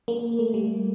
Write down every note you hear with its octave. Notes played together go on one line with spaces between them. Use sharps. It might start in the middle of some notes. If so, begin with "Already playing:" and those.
A#3
A3
G3